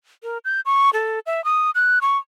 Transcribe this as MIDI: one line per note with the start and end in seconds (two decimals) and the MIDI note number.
0.23 0.38 70
0.45 0.61 91
0.66 0.90 85
0.93 1.19 69
1.26 1.44 76
1.45 1.71 87
1.75 1.99 90
2.02 2.18 85